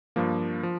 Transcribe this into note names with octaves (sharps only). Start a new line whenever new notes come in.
G2 F3 A#3
F3